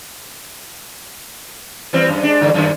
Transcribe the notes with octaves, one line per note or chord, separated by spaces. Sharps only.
E3 G3 C4
F#2
G#3 D4
G2 D3 E3
F#2 D#3